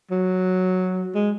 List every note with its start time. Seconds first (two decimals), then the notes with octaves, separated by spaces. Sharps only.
0.11 F#3
1.15 G#3